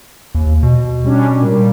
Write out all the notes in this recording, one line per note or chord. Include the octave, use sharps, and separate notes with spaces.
D#2
B2
G3 C#4 D4
A#2 G3